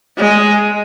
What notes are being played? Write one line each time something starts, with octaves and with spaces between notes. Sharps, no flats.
G#3